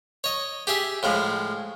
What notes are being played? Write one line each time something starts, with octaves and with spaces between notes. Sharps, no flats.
C#5 D#5
G4 G#4 E5
A2 F3 G#3